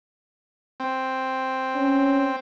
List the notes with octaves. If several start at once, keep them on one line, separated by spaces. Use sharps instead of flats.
C4
C#4